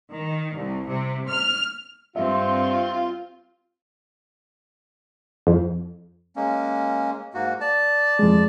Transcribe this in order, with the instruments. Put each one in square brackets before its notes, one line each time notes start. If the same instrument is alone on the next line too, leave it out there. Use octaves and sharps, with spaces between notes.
[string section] D#3
C2
C3
F6
[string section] G2 C4 [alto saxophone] F4 [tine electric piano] E5
[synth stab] F2
[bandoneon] G#3 A#3 C#4
G#2 A#3 F#4
D5 A5
[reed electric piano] F2 G#3